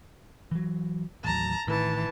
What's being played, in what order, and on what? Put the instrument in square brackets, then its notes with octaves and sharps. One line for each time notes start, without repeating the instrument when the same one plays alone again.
[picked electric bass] E3 F#3
[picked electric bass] A1 D#2 F#3 [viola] A5 A#5
[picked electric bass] A1 A2 D#3 [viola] E3 A5